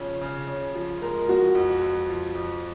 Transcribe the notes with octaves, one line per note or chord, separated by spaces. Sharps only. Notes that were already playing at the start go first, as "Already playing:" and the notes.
Already playing: C#3 F3 C#4
C#3
C#4
F3
G#3 A#4
F3 F#4
F2
F2
F3
F2